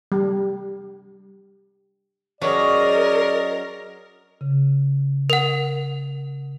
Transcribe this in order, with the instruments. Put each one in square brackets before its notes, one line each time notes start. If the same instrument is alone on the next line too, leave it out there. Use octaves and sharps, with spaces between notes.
[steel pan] G3
[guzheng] F#3 C#4 [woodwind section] G#4 D5 D#5 [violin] A#4
[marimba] C#3
[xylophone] A#4 F#5